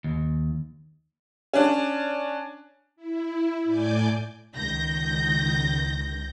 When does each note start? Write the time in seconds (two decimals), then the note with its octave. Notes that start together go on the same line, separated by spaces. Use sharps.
0.04 D#2
1.53 C#4 D4
2.96 E4
3.65 A2 D5 G#5 D6 G6
4.55 C#2 D#3 G6 A#6